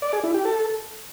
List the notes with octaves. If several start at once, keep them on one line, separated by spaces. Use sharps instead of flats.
D5
G#4
E4
G4
A4